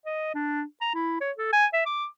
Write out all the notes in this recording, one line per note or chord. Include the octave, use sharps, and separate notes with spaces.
D#5
D4
A#5
E4
C#5
A4
G#5
E5
D6